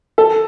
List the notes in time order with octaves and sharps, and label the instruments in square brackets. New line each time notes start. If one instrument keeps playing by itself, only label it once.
[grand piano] A4